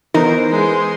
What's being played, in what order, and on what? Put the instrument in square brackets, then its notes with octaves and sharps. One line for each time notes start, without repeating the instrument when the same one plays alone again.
[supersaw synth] E3 B3 C5 [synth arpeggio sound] D#4 [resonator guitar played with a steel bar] A#4
[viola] G#3 C6